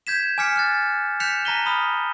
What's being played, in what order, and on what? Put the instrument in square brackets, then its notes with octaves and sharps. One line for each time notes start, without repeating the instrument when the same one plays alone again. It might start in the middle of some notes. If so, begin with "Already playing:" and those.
[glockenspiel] G6 G#6 B6 E7
G#5 D6 F6 B6 C#7
F6 F#6 A6
F#6 G6 B6 C#7 E7 F7
A5 A#5 A#6 B6 D#7 G7
B5 D#6 F6